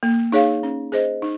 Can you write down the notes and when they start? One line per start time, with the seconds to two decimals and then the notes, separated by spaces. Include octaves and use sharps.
0.03 A#3
0.32 D#4 G#4 C#5 F5
0.63 C#4
0.92 G#4 C5 D#5
1.22 D#4